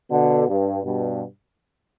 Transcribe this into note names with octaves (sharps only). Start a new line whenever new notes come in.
B2 D3
G2
G2 B2